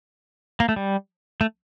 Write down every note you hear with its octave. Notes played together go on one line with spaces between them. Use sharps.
A#3
A3
G3
A3